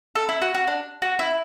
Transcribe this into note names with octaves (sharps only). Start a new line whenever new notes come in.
A4
E4
F#4
F#4
D4
F#4
E4